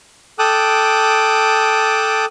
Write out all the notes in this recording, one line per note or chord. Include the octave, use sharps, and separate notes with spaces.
A4 G5 A5 D6 D#6 F#6